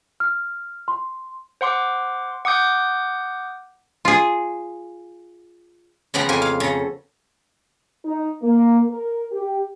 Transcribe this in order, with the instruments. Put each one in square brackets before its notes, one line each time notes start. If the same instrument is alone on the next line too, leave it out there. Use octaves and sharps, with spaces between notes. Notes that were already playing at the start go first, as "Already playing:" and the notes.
[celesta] F6
C6
[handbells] C5 F#5 C6 D6
F#5 D6 D#6 G6
[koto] F4 G#4
[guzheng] C#3 F3 B3 G4 A#5
F2 F3 G4 G#5
F5
C#3 A4 A#5
[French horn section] D#4
A#3
A#4
G4